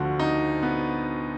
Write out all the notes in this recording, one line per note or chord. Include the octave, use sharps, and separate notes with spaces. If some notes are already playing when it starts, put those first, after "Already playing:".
Already playing: D2 D3 F3 F#4
D#4
B3